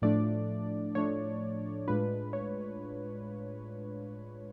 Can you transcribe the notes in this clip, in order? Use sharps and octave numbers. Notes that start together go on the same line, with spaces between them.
A2 F3 A3 D4 D5
A2 F3 A3 D4 C#5
A2 G#3 D4 F4 B4
C#5